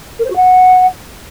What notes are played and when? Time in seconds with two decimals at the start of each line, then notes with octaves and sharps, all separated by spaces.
0.19 A#4
0.25 C5
0.30 F#4
0.36 F#5